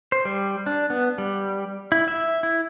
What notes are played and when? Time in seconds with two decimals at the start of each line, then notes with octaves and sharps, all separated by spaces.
0.12 C5
0.25 G3
0.66 D4
0.90 B3
1.18 G3
1.92 E4
2.08 E5
2.43 E4